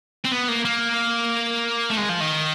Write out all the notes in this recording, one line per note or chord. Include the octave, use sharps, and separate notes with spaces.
C4
B3
A#3
A#3
A3
G#3
F3
D#3